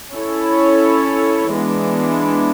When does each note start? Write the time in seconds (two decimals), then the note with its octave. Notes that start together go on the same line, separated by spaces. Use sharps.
0.13 C#4 E4 A4 C#5
1.54 E3 G#3 B3 D4